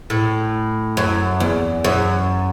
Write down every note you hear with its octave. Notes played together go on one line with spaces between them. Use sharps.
A2
F#2
E2
F#2